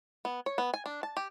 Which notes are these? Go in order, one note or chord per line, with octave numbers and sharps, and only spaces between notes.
B3
C#5
B3
G#5
D4
A5
G4